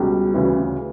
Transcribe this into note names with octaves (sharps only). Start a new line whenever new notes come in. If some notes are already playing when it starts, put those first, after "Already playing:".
Already playing: C#2 B2 G3
D2 C#3 E3